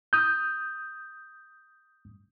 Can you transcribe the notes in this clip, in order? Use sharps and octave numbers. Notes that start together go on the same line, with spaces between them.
D#6 G6